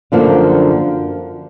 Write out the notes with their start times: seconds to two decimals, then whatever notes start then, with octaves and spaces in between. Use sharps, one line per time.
0.12 F#2 D3 F3 A#3